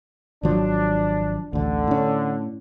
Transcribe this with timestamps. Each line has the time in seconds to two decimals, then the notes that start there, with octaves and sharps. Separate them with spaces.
0.43 G#1 F3 F#3 D4
1.53 A1 D2 D3
1.87 A2 C#4